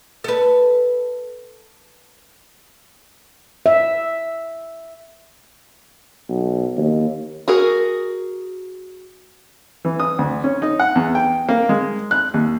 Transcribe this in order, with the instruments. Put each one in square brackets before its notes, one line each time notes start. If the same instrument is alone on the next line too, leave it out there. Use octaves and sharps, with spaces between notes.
[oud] A4 B4
[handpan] E5
[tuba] B1
D#2
[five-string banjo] F#4 G#4 A#4
[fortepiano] E3
D#6
D2
C#4
D#4
F#5
E2
G5
A#3
G#3
F#6
D#2